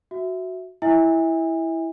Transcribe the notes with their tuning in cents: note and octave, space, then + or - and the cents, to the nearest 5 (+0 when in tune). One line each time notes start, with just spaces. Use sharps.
F#4 +0 E5 +0
E4 +0 E5 -30 G#5 -35